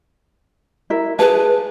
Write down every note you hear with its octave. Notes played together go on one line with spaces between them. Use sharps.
E4 A#4 E5
G#4 B4 A5